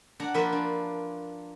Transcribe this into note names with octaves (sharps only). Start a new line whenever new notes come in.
D4 F#5 A#5
F3 A#3 A#4 B4 E5
D4